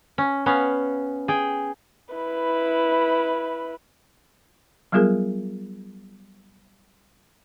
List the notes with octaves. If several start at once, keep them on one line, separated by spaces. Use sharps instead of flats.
C#4
B3 C#4 F5
G#4 G5
E4 B4
F#3 G3 B3 F4 G#4 A#4